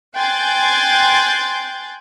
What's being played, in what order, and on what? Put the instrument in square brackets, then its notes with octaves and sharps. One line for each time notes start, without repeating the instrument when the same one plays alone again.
[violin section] G5 G#5 C6 F#6 G6 A6